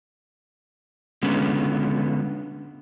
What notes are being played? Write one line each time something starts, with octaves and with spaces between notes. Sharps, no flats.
D3 G#3 B3 C#4 B4